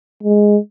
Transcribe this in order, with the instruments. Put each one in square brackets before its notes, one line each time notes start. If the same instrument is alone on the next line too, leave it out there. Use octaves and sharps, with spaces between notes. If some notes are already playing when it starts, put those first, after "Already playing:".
[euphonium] G#3